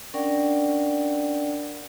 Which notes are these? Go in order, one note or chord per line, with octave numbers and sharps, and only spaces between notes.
C#4 D4 A#4 D5 F#5 G5